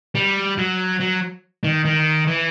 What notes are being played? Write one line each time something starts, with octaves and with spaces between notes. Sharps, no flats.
G3
F#3
F#3
D#3
D#3
E3